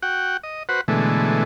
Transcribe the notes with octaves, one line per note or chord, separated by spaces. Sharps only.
F#4 F#5 G5
D#5
F#4 B4 C5 F#5
B2 D3 E3 G#3 A3